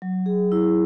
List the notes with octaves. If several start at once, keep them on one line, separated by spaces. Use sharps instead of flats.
F#3
G#4
E4